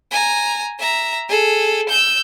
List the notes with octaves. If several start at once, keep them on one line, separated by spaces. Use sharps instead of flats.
G#5 A#5
E5 A#5
G#4 A4
E6 G6